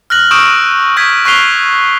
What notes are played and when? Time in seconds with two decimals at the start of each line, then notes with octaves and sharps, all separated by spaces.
0.10 F6 F#6 A#6 F#7
0.31 C#6 D#6 E6 G6 D7 E7
0.97 C#6 G6 G#6 B6
1.25 C#6 F#6 B6 C7 F7 G7